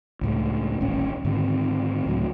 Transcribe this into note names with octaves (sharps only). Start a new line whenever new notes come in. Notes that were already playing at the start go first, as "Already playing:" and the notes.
C#2 A2 G#3
D#1 A1 C#4
G#2 D3 D#3 C4
C#2 A2 F#3